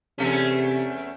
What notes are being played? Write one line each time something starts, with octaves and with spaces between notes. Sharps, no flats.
E2 C3 A3 C#4